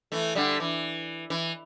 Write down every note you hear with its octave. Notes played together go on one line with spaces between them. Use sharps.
E3 A3
D3 G3
E3
E3